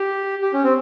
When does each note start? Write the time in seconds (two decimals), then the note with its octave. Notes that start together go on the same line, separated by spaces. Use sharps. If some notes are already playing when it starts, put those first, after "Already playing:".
Already playing: G4
0.42 G4
0.53 C#4
0.64 C4